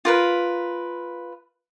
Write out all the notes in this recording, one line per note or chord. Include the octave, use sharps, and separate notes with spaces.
F4 A#4 B4